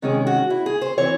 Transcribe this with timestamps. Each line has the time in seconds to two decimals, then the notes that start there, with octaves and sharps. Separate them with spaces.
0.02 C3 D#3 G#3 C#4 G#4
0.27 F#4
0.50 E4
0.66 G#4
0.81 C5
0.98 E3 C4 C#5